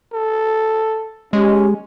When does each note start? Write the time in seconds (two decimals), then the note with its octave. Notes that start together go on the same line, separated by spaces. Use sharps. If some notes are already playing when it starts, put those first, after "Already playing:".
0.13 A4
1.33 G#3 C#4 G4